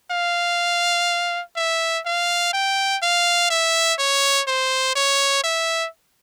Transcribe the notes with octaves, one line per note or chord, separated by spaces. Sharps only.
F5
E5
F5
G5
F5
E5
C#5
C5
C#5
E5